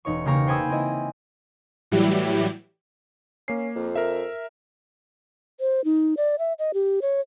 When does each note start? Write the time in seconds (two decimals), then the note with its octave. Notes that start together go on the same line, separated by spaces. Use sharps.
0.05 E1 D#4 C#5 C#6
0.25 C#3 A#3 G4 A#5 C#6
0.47 C5 G5 G#5 B5 D#6 E6
0.70 C4 E4 D#5
1.92 A2 E3 F#3 G3 E4 G4
3.48 A#3 C#4 C7
3.75 F2
3.96 A#4 E5
5.60 C5
5.85 D#4
6.17 D5
6.39 E5
6.59 D#5
6.74 G4
7.02 C#5